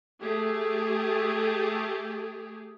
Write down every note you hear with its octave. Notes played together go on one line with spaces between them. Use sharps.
A3 G4 G#4